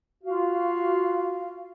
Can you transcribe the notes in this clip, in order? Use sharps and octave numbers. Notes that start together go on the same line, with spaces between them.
F4 F#4 F5